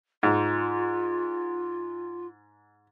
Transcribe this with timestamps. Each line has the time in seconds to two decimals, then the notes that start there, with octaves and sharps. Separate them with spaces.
0.23 G#2 F4